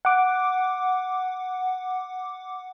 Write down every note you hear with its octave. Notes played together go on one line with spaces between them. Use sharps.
F#5 D6